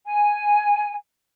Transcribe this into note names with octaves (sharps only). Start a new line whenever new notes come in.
G#5